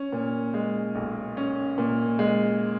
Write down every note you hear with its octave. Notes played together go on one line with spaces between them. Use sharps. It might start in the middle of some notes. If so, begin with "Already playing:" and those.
Already playing: C#4
A#2
G#3
B1
C#4
A#2
G#3